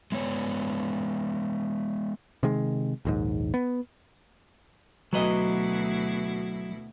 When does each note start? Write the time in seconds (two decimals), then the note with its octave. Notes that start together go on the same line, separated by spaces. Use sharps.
0.12 G#3 B3 C#5
2.43 C3 D#3 G#3
3.05 A#1 D#2 G#2
3.54 B3
5.13 D2 B2 F#3 E4 B4 D#5